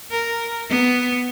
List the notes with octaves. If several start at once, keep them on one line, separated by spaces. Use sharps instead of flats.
A#4
B3